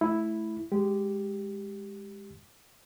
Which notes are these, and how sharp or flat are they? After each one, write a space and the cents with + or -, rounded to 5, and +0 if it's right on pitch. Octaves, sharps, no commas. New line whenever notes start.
A3 -20 E4 +0
G#3 -10 G4 +0